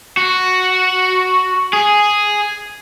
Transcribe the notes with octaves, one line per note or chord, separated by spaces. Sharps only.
F#4
G#4